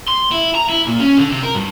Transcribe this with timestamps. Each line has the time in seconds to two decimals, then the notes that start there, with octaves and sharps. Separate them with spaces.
0.08 C6
0.32 E4
0.55 A#5
0.70 E4
0.87 A#2
1.00 C#4
1.18 D3
1.31 C3
1.43 A#4
1.55 G2